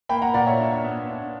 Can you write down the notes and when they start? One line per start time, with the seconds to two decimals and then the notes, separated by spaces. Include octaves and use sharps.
0.09 A#3 G5 B5
0.22 F#5 A#5
0.34 A#2 D5 F#5
0.46 C#5 E5
0.59 D4
0.84 B3
1.09 D4